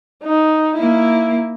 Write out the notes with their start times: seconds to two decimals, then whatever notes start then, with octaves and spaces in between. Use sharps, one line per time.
0.24 D#4
0.76 A#3 E4